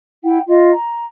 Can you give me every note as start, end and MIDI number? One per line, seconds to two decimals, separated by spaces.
0.23 0.38 64
0.23 0.38 78
0.23 0.38 79
0.47 0.71 65
0.47 0.71 75
0.73 1.04 82